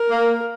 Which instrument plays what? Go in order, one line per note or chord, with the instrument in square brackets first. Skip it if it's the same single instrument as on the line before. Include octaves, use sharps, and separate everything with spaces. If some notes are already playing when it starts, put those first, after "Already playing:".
Already playing: [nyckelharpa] A#4
[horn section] A#3